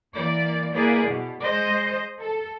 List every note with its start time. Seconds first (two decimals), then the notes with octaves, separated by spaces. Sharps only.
0.15 E3 A#3 D5
0.73 A#3 E4 G#4 B4 D5
1.06 B2
1.41 G#3 C5 D#5
2.21 A4